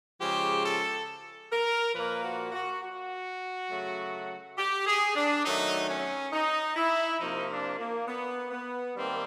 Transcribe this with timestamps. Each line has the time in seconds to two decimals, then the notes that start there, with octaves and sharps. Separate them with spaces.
0.19 C#3 F3 G#3 G4
0.62 A4
1.50 A#4
1.93 A#2 F3 A#3 B4
2.23 F#4
2.52 F#4
2.81 F#4
3.69 C#3 F#3 A3
4.57 G4
4.85 G#4
5.15 D4
5.44 D#3 F#3 A3 D#4
5.88 C#4
6.32 D#4
6.75 E4
7.19 C3 F3 A#3 D#4
7.48 D4
7.78 A#3
8.06 B3
8.51 B3
8.94 D#3 G3 A#3 C4